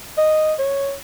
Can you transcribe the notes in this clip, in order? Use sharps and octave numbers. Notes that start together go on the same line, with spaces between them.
D#5
C#5